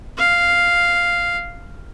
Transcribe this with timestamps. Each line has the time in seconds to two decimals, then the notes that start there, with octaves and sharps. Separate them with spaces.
0.18 F5